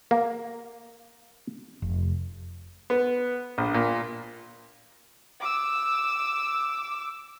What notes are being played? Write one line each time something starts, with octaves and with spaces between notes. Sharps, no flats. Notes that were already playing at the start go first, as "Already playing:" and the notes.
A#3
F1
B3
A#1
A#2
D6 E6